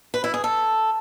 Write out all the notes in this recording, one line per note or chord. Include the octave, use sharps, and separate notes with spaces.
B4
E4
G#4
A4